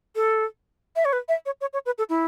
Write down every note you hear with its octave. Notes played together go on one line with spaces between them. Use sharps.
A4
E5
C#5
B4
E5
C#5
C#5
C#5
B4
A4
E4